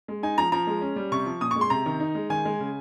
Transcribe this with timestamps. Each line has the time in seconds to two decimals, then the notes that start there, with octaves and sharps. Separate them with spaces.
0.08 G#3
0.23 D#4 G#5
0.38 F3 A#5
0.52 F3 A#5
0.67 G#3
0.81 C#4
0.96 G3
1.12 C3 C#6
1.26 F3
1.41 A#2 D#6
1.51 G#3 C#6
1.61 C6
1.70 C3 A#5
1.86 D#3
2.00 D#4
2.15 G#3
2.30 D#3 G#5
2.45 G#3
2.60 C#3